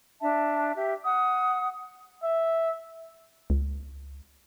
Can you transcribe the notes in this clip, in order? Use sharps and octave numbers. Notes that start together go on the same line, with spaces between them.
D4 E5 A5
G4 E5
F#5 D#6
E5
C#2